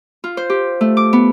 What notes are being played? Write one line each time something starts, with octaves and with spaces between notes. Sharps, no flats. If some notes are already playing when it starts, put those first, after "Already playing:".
F4
C5
G4
A3
D6
B3